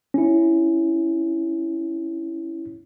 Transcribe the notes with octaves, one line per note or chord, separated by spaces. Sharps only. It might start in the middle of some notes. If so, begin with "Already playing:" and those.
C#4 E4